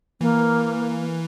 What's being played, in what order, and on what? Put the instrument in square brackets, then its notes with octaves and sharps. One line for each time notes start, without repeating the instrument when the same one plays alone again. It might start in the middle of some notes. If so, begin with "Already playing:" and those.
[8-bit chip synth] E3 [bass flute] A#3